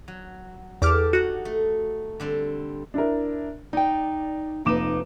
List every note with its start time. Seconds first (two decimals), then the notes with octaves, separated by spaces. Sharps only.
0.08 F#3
0.82 E2 G4 A4 D6 F6
1.13 D#4 F#4 F#5
1.45 A3
2.20 D3 G3 C4
2.94 D4 E4 A#4
3.73 D#4 D5 G5
4.65 F1 A#3 D#4 B4 D6 E7